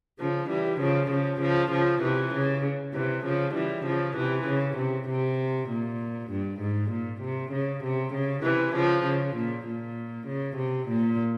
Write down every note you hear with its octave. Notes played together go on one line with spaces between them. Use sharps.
C#3 F3
E3 G3
C#3 F3
C#3 F3
C#3 F3
C#3 F3
C3 E3
C#3
C3 E3
C#3 F3
E3 G3
C#3 F3
C3 E3
C#3
C3
C3
A#2
G2
G#2
A#2
C3
C#3
C3
C#3
C3 E3
C#3 F3
C#3
A#2
A#2
C#3
C3
A#2